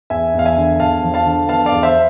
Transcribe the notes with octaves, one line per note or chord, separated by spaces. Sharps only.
E2 E5 G#5
E2 F5
E5 G#5
D3
E2 F5 A5
F3
F5 A5
D3
B3 F5 A5
D5 F5
E2
C5 E5